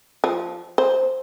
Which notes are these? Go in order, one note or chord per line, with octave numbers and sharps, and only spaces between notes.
F3
C5